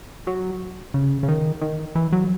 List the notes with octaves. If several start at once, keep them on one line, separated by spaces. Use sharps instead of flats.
F#3
C#3
C#3
D#3
D#3
E3
F#3